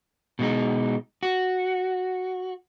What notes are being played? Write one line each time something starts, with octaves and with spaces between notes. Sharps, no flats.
B2 G#3 D#4
F#4